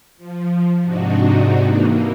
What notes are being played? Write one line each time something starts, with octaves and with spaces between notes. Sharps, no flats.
F3
G#2 C3 D4 D#4 F#4
E3 A#3